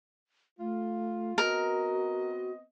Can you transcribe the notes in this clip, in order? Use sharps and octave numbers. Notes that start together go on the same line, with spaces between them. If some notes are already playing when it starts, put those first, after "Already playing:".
A3 F4
B3 C4 F#4 A#4 D#5